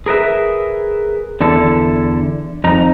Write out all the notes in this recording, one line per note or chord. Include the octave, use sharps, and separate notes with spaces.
G#4 A#4 B4 E5
E2 D3 E4 A4
F2 D#4 A#5